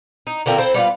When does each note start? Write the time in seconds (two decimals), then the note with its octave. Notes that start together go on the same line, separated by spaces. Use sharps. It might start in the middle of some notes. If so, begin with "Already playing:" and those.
0.27 D#4
0.46 D3 F3 A#3 C4
0.58 C4 E4 A4 C5
0.74 G3 B3 F4